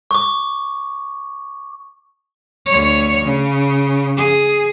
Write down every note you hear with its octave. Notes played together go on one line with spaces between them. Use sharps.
C#6 D6
D2 C#5
C#3
G#4